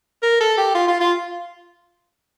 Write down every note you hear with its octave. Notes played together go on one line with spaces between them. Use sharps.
A#4
A4
G4
F4
F4
F4